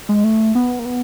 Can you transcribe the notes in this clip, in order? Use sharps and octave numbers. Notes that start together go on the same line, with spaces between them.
G#3
A3
B3
A#3
B3